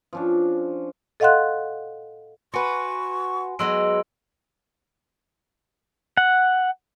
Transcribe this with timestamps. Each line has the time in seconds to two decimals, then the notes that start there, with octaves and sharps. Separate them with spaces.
0.13 F3 C#4 D4
1.20 A4 D#5 F5 F#5 C6 F#6
2.54 F#4 B4 G#5 C6 C#6
3.59 F#3 G#3 B3 C6 E6 D7
6.17 F#5